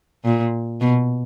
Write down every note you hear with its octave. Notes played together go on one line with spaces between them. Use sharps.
A#2
B2